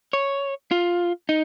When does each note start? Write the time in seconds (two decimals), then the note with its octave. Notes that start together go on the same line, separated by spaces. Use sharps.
0.13 C#5
0.71 F4
1.29 D#4